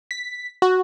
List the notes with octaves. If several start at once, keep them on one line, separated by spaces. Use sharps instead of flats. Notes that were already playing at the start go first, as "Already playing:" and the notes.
B6
F#4